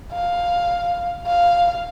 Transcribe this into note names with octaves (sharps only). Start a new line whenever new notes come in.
F5
F5